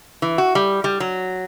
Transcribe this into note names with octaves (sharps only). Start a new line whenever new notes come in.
E3
F#4
G3
G3
F#3